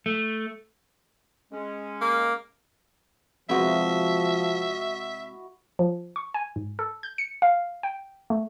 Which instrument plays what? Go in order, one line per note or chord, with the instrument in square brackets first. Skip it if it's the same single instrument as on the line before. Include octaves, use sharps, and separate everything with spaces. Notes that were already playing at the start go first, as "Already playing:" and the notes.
[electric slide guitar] A3
[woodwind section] G#3 C#4
[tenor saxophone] A#3
[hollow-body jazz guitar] C3 G#3 B3 [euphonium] F3 [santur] E4 F#4 D#5 [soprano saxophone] E5
[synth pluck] F3
C#6
G#5
G#2
A4
G6
C#7
F5
G5
A3